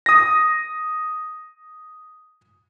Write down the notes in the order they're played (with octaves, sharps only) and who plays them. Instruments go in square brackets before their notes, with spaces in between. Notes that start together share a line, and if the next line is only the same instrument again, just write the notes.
[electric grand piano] D#6 A#6